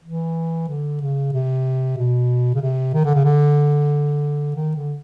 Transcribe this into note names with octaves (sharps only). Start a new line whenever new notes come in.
E3
D3
C#3
C3
B2
C#3
C3
D#3
D3
C#3
D3
D#3
D3